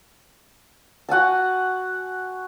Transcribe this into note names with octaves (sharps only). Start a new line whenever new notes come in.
F#4 F#5 G#5 A5